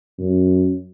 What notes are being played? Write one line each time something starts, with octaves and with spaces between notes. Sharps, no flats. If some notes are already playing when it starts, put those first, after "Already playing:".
F#2